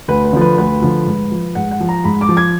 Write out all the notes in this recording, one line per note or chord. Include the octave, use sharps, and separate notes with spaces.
D2 B4
B4
D3 F3
B4
D2 B4
D3 F3
G#2
F3
G#2 F#5
F#5
F3
A#5
G#2 B5
D6
F3
G#6